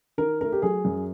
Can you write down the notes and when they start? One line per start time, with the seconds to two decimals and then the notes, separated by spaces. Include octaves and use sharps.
0.18 D#3 A#4
0.41 A3 A#4
0.52 G4
0.62 F#3 G#4
0.85 F#2